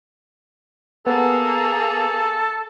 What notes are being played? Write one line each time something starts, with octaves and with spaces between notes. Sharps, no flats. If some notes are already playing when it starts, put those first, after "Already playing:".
A#3 B3 G#4 A4